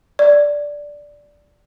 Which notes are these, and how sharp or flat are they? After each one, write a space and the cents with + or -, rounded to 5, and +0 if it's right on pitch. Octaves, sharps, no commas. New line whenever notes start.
D5 -5